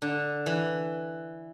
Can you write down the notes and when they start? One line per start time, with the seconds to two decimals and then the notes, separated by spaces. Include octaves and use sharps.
0.02 D3
0.46 E3